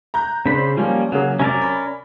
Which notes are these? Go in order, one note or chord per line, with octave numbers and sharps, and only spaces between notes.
A#5 F#6 G6
C#3 C4 D4 C5 B5
F3 G3 A#3 C#4
C#3 F#3 A#3 G#4
C3 F#3 C#4 A#4 D5
B5